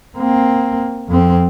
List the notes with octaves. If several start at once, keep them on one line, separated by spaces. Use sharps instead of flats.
A#3 C4
F2 C4